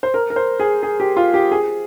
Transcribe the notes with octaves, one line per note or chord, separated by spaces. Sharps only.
C5
A#4
A#4
C5
G#4
G#4
G4
F4
G4
G#4